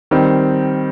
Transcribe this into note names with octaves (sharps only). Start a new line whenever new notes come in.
D#3 G3 C4